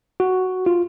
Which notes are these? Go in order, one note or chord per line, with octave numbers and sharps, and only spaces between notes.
F#4
F4